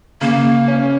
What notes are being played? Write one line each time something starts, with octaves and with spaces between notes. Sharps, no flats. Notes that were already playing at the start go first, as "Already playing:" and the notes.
C#3 A#3
C#4